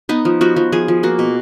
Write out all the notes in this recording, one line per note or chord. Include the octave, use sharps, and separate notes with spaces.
B3 D#4
F3
F3 F#4
F3
F3 G#4
F3
A#3 F#4
B2